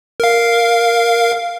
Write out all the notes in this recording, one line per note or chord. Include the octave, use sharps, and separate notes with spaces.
A#4 F5